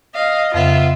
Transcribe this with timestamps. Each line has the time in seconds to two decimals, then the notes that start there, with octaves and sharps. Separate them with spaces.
0.15 D#5 F5
0.54 F2 C#3 B3 F4 E5